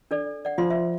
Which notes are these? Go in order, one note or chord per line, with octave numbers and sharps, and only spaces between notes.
D4 A4 D5
D5 F#5
F3 F4 C6
E5